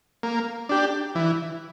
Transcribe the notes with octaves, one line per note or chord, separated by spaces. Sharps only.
A#3
D4 G4
E3